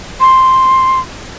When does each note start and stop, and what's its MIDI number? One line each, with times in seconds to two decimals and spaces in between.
0.20 1.00 84